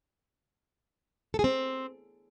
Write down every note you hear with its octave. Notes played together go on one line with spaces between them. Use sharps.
A4
G#4
C4